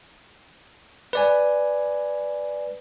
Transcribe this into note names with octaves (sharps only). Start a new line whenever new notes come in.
B4 D5 G#5